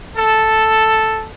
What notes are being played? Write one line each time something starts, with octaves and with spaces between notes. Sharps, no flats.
A4